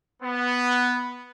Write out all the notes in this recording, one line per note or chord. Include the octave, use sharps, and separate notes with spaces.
B3